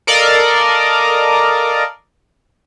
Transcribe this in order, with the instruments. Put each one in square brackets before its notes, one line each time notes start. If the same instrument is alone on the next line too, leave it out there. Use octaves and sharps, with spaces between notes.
[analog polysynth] A4 A#4 D5 D#5 F5